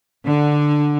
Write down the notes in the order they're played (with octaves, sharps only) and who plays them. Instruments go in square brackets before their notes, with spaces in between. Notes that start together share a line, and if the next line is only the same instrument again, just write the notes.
[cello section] D3